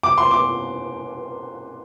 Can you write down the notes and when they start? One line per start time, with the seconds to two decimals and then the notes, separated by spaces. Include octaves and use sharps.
0.03 D6
0.18 C6
0.31 D6